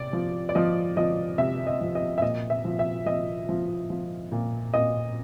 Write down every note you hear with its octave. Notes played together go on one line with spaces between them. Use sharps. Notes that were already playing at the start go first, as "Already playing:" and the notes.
Already playing: C3 D5
F3
D5
F3 D#5
F3 D#5
C3 E5
D#5
F3
D#5
E5
A#2 D#5
E5
F3
E5
F3 D#5
F3
F3
A#2
A#2 D#5